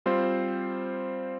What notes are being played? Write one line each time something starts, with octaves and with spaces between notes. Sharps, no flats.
G3 C4 F4 C5